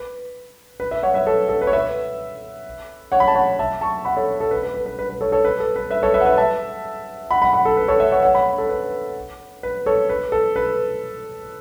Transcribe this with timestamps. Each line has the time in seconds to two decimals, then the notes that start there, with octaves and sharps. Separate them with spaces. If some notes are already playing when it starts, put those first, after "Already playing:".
Already playing: B4
0.80 B4
0.91 B4 E5
1.03 C#5 F#5
1.14 B4 E5
1.27 A4 C#5
1.49 A4
1.61 B4
1.67 C#5
1.73 B4 E5
3.12 C#5 F#5
3.20 B5
3.28 A5
3.35 C#5 F#5
3.59 E5 A5
3.81 A5 C#6
4.05 F#5 B5
4.16 A4 C#5
4.40 A4
4.51 B4
4.63 B4
4.74 B4
4.86 B4
4.99 B4
5.09 B4
5.21 A4 C#5
5.32 A4 C#5
5.45 B4
5.60 A4
5.76 B4
5.90 B4 E5
6.03 A4 C#5
6.14 B4 E5
6.21 F#5
6.25 B4 E5
6.37 E5 A5
7.31 F#5 B5
7.42 F#5 B5
7.53 F#5 B5
7.65 A4
7.77 B4
7.88 A4 C#5
8.00 B4 E5
8.12 C#5 F#5
8.23 C#5 F#5
8.35 F#5 B5
8.58 A4
8.69 B4
9.63 B4
9.86 A4 C#5
10.09 B4
10.32 A4
10.56 B4